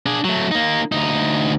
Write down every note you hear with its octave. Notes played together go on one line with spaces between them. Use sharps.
D4 G#4
F#3 A3
A#3 D#4
D2 D#4